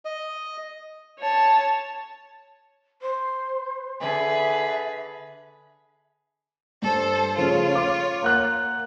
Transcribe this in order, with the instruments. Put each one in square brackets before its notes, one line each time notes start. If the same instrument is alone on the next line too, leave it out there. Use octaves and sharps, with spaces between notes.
[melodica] D#5
[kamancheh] C#5 A5
[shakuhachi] C5
[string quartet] D3 G#4 B4 [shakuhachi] E5
[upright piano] G2 [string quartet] A4 C5
[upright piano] C#3 F3 A3 [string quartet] F4 C#5
[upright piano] D6
A#3 F#5 F#6